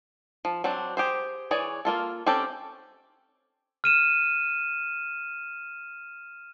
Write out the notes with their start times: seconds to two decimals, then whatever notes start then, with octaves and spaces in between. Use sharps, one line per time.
0.45 F3
0.64 F#3 C4 D4
0.97 G4 G#4 C5
1.51 E3 G#4 C#5 D5
1.85 A#3 F4 A4
2.26 C4 C#4 G4 A4
3.84 F6 D#7 E7